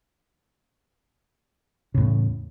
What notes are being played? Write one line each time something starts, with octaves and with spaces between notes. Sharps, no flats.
E2 A2 C#3